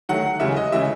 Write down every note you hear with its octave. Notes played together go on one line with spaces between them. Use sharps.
D#3 F#3 A3 F#5
C#3 E3 G#3 E5
D#5
C#3 E3 G#3 E5